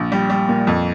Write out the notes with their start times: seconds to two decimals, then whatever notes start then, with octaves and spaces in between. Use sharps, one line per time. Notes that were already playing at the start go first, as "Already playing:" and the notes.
Already playing: A#1
0.12 G3
0.30 G3
0.49 A#2
0.67 F2